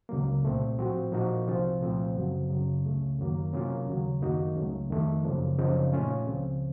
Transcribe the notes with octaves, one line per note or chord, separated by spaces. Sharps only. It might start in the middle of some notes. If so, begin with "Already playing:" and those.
C#2 C#3 F#3 A#3
C2 A#2 A3 C4
A2 F3 C4 F#4
A#2 F3 A#3 D#4 F#4
C2 C3 F3 C4 F4
C2 A#2 F3 A3 C4
F#2 C#3 F#3 C4 F#4
F#2 C#3 F#3
C#2 C#3 A3
F#2 D#3 F#3 A#3
C3 F#3 A#3 C#4 F4
D#2 C#3 F#3
F#2 D#3 A#3 D#4 F#4
C#2 C#3 F#3 A3
F2 D#3 A3
F#2 C#3 F3 A#3
F#2 C#3 F3 C4 D#4
A#2 A3 C#4 F4
C#2 C#3 F3 C4